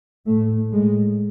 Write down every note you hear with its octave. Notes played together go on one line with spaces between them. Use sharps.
A2 A3
A2 G#3